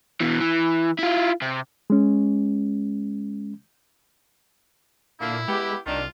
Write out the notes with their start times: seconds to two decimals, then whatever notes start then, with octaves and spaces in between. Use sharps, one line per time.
0.20 B2 E3
0.40 E3
0.99 E4 F4
1.42 C3
1.90 G#3 C#4
5.20 A#2 D3 A#3 E4
5.48 G#3 B3 G4
5.86 C2 D#3 D4 F4